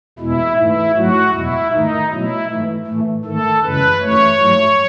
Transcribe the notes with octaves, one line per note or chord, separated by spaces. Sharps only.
E2 B2 G#3 E4
G#2 E3 A3 E4
G#2 F#3 A3 F#4
E2 B2 G#3 E4
G#2 D#3 A3 D#4
B2 F#3 A3 E4
G#2 E3 A3
A2 E3 A3
G#2 D#3 A3 A4
F#2 C#3 E3 G#3 B4
F#2 E3 A3 C#5
G#2 F#3 A3